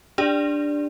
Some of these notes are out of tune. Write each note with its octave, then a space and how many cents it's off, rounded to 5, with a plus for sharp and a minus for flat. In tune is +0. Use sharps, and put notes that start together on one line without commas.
D4 +0 G4 +30 D5 +0